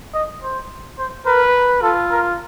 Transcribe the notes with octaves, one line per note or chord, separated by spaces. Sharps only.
D#5
C5
C5
A#4 B4
F4 A4
A#4